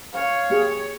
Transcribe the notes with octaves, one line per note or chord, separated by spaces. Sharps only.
C#5 F5
A#3 G4 G#4